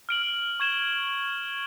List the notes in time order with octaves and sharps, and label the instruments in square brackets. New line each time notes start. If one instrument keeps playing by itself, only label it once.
[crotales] F6 D7 F#7
C#6 G#6 E7 G7